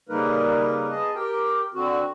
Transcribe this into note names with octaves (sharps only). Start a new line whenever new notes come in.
C#3 G3 A#3 D#4 A#4 B4
B3 G#4 D#5 A5
G4 A#4 G5
D3 C4 F#4